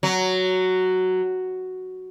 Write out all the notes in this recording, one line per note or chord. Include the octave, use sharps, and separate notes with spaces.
F#3